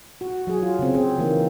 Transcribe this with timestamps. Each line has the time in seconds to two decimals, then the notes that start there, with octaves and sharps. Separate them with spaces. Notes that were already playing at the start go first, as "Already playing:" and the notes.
0.21 F#4
0.47 F#3 G#4
0.62 F4
0.79 C#3 C4
0.95 C4 G#4
1.18 E3 A#3 D#4